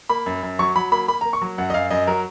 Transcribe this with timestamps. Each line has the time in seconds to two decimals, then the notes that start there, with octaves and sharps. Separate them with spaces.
0.09 A#3 B5
0.26 F#2
0.43 F#2
0.59 F#3 C#6
0.76 F#3 B5
0.92 A#3 B5
1.08 A#3 B5
1.21 A#5
1.25 A#3
1.33 C#6
1.42 F#3
1.58 F#2 F#5
1.70 D#5
1.74 F#2 F5
1.91 F#2 D#5
2.07 F#3 A#4